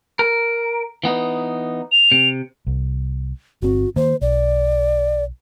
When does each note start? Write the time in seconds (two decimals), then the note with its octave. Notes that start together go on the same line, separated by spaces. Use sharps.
0.19 A#4
1.04 E3 B3 D#4
1.92 F7
2.12 C3
2.67 C2
3.62 G1 C4 F#4
3.96 D#3 A#3 C5
4.21 B1 D5